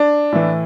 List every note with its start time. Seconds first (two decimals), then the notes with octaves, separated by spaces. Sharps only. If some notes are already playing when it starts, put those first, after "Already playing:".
Already playing: D4
0.32 A2 E3